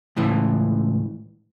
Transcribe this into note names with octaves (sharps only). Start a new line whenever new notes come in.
C#2 A2 E3